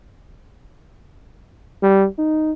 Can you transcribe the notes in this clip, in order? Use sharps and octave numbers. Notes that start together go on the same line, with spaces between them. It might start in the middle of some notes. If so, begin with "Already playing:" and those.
G3
D#4